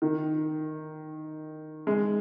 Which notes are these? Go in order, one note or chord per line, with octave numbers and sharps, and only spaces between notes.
D#3
G#3